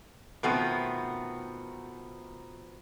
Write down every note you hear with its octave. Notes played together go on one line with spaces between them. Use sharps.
B2 D#3 F3 A3 B3 C4